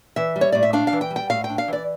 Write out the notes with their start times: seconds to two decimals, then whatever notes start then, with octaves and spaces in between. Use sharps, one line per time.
0.16 E3 E5
0.36 G3
0.41 C#5
0.52 A2 D5
0.63 E5
0.73 D4 F5
0.87 F5
0.93 E3
1.01 G5
1.10 G3
1.16 G5
1.29 A2 F5
1.44 G5
1.49 D4
1.58 F5
1.68 E3 D5